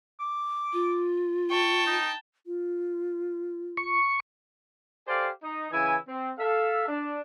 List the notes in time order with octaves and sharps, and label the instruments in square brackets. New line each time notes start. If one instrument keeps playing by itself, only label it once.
[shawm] D6
[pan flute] F4
[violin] G5 A5 [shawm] C#6
[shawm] D#4
[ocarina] F4
[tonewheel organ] C#6
[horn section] G4 A4 C5 D5 F5 G#5
D#4
C#3 E3 E4 G#5
C4
A4 E5 F5
D4